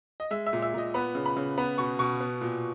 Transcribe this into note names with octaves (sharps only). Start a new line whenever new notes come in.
D#5
G#3 E5
E5
A#2
E5
A#2 D#5
B3 B5
C#3
B5
C#3
B3 B5
B2 C#6
B2 C#6
B3
A#2